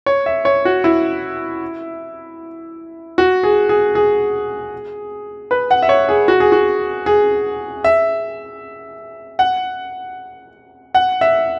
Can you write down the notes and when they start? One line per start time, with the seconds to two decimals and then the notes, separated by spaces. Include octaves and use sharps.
0.06 C#5
0.26 E5
0.45 C#5
0.65 F#4
0.84 E4
3.18 F#4
3.43 G#4
3.69 G#4
3.95 G#4
5.51 B4
5.71 F#5
5.82 E5
5.89 C#5
6.09 G#4
6.28 F#4
6.40 G#4
6.52 F#4
7.06 G#4
7.84 E5
9.39 F#5
10.94 F#5
11.21 E5